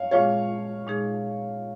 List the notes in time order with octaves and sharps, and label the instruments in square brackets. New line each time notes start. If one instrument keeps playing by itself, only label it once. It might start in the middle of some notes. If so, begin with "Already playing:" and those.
Already playing: [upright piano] C#5 F5
[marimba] A#2 G#3 F4 G#4 [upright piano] C#5 F5
[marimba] A#2 G#3 D#4 G#4